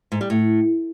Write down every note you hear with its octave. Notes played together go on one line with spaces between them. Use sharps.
G#2
G3
A2